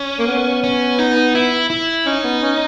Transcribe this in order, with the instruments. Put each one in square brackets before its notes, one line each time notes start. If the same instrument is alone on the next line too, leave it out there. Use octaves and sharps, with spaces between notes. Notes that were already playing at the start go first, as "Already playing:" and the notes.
Already playing: [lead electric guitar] C#4
[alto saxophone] A#3
B3
[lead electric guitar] C#4
D#4
E4
E4
[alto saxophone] C#4 [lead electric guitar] D#4
[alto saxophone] B3
C#4